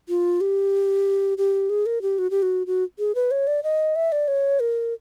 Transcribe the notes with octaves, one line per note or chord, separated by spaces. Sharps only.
F4
G4
G4
G#4
A#4
G4
F#4
G4
F#4
F#4
G#4
B4
C#5
D5
D#5
E5
D5
C#5
A#4